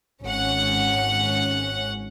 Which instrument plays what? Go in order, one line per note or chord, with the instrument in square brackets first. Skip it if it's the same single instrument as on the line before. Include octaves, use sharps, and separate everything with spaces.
[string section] G#1 C#4 F#5